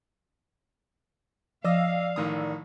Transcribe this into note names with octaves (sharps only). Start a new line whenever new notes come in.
F3 D5 D#5 F5 E6
A1 D#3 D#6